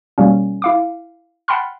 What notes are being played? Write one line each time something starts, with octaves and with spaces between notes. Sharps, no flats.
B2 G3 A#3 C#4
E4 F5 D6
F#5 G5 A5 B5 C6 F6